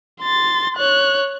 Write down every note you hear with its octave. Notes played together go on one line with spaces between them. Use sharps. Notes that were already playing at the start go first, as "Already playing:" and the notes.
C6 A6
C#5 F#6